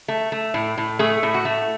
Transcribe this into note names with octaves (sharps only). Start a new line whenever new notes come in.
A3
A3
A2
A2
A3 G#4
A2
F#4
A3